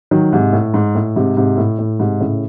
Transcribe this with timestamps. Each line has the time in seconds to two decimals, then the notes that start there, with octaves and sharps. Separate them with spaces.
0.11 D#3 F#3
0.32 G#2 C3
0.53 A2
0.74 G#2
0.95 A2
1.16 G#2 C3
1.37 G#2 C3
1.58 A2
1.79 A2
2.00 G#2 C3
2.20 A2 C#3